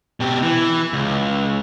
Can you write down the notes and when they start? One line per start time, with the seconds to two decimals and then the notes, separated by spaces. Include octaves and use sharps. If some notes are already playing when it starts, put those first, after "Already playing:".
0.20 B2 G4
0.43 E3
0.93 C#2